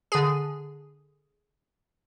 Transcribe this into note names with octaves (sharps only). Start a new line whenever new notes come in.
D3 G#4